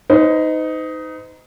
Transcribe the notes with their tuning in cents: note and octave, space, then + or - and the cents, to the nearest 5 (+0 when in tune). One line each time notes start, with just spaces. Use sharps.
D#4 +10 C5 -45